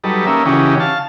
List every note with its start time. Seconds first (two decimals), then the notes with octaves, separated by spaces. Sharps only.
0.04 F#3 G3 D#4 A4 B4
0.26 A#3 C#4 D#4 E5
0.46 C#3 E3 C#4 D#4 F#4 G4
0.80 F5 A5